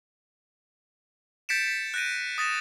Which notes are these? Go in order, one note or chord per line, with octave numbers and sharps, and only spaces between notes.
G6 A6 B6 C#7 D7 E7
B6
F#6 G6 A#6 D7 D#7
D#6 A6 A#6 E7